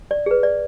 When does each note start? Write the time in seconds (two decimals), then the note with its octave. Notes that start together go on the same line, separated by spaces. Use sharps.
0.11 D5
0.26 G#4 B4
0.43 D5